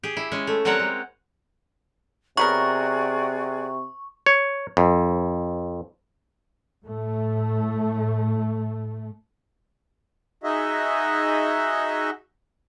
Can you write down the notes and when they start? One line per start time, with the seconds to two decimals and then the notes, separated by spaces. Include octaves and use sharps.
0.03 G4 G#4
0.17 E4
0.32 G#3 C#4
0.47 A3
0.65 F#3 G3 C4 A#4 C#5 F#5
0.80 G#3
2.37 C3 F#3 B3 F#4 G#4 A#4 D5 C#6
4.26 C#5
4.77 F2
6.85 A2 A3
10.43 D#4 F#4 G#4 D#5 E5